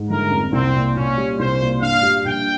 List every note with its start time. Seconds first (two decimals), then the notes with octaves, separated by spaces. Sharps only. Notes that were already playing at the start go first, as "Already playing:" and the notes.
Already playing: G#2
0.10 G1 A#4
0.31 F2
0.52 C2 C4
0.75 A#2
0.96 A#2 C#4
1.17 G3
1.39 C2 C5
1.61 A#2
1.81 G2 F5
2.03 G3
2.25 A#1 G5